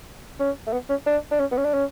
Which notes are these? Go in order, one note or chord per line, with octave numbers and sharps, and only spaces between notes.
C#4
A3
B3
C#4
D4
D4
C#4
B3
C#4
D4
C#4